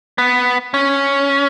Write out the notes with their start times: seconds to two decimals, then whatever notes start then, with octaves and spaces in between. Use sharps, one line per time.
0.18 B3
0.74 C#4